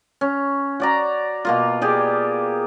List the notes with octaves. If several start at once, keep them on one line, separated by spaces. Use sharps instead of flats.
C#4
F#4 D5 A#5
B2 A#3 F4
G4 G#4 D5